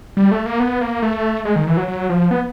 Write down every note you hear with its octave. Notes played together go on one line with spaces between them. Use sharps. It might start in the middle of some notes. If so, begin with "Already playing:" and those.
G3
A3
A#3
B3
A#3
A3
G#3
D#3
E3
F#3
F#3
F3
B3